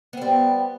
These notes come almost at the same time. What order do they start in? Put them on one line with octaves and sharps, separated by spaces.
B3 C5 G3